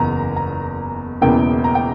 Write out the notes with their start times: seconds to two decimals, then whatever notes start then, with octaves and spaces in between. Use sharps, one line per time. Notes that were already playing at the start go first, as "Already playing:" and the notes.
Already playing: F#1 E2 A#5
0.36 A#5
1.21 E1 E2 C#3 E3 A#3 G5
1.64 A#5
1.75 G5